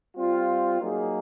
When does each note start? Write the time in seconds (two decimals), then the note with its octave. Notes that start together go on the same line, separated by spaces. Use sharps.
0.15 G3 C4 F4
0.79 F#3 A#3 D#4 G#4